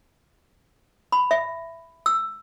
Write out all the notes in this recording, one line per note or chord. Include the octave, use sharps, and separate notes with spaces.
B5
E5
E6